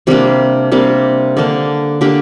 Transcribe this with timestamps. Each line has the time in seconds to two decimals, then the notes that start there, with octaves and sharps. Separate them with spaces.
0.07 C3 G3 A#3 D4 G4
0.72 C3 G3 A#3 D4
1.37 D3 A#3 D4
2.01 D3 A#3 D4 G4